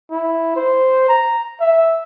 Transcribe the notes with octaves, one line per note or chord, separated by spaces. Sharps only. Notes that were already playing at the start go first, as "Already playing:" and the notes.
E4
C5
A#5
E5